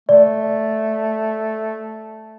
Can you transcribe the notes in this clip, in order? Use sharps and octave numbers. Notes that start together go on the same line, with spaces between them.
A3 D5